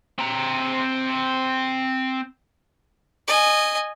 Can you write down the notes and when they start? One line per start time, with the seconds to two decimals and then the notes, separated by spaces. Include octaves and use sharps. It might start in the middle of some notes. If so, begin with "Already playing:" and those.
0.19 C4 A#5
3.28 D#5 G#5